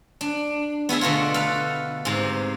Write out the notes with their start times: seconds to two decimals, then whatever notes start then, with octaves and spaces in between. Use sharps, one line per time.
0.21 D4
0.89 B3 E4 G#4 E5
1.01 B2 D3 A3 F4
1.34 A4 B4 F5
2.05 G#2 C3